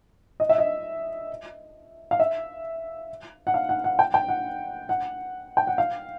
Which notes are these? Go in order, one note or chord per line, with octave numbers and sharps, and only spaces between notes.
D#5
E5
D#5
F5
E5
F#5
F5
F#5
F#5
G5
G5
F#5
F#5
G5
F#5
F5